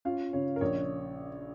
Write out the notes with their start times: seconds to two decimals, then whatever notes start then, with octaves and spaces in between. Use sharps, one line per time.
0.05 C#4 F4 F5
0.33 C#3 C#5
0.56 A#4
0.61 A#1 C#5